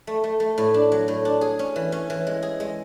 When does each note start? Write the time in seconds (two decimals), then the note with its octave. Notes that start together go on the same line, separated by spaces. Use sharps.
0.07 A3
0.24 A3
0.40 A3
0.58 A2
0.74 D4
0.92 F#3
1.08 A2
1.25 D4
1.41 G#4
1.59 C#4
1.76 E3
1.92 C#4
2.10 E3
2.27 G#3
2.42 G#4
2.60 G#3